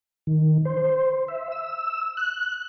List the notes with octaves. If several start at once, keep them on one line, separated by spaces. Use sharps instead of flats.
D#3
C5
E5
E6
F#6